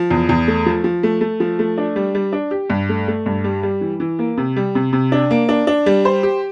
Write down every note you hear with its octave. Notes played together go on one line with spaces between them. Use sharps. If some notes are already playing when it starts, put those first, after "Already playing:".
Already playing: F3
E2
E2
A3
F3
F3
A3
A3
F3
A3
D4
G3
G3
D4
G4
G2
A3
A3
G2
G3
G3
E3
E3
A#3
C3
G3
C3
C3
D4
A#3
D4
D4
G3
C5
G4